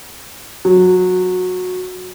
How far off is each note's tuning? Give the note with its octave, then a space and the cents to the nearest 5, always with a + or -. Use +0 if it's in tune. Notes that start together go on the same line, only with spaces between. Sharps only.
F#3 -20